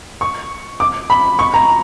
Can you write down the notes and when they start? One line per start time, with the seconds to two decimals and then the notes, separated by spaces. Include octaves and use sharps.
0.21 C#6
0.80 D6
1.10 B5
1.39 C#6
1.54 A#5